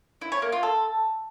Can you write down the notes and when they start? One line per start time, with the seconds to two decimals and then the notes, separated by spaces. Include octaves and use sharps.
0.21 E4
0.32 C#5
0.42 A#3
0.52 F4
0.63 A4